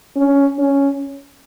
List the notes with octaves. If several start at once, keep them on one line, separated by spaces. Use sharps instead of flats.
C#4
C#4